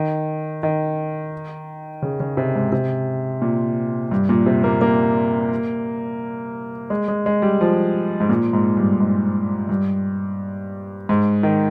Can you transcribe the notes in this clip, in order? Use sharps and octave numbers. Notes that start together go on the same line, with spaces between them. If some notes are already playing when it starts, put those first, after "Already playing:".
Already playing: D#3
D#3
C#3
C#3
C3
G#2
C3
A#2
G2
A#2
C3
A#3
A#3
G#3
G#3
G#3
G3
F3
G#2
A#2
G#2
G2
G#2
G2
G#2
D#3